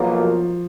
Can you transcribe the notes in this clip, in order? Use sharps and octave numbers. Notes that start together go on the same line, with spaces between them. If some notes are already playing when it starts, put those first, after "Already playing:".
Already playing: B1 B2 F3 F#3 A#3
F3